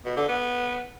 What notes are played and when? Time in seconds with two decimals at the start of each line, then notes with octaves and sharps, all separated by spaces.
0.05 B2
0.17 D3
0.28 B3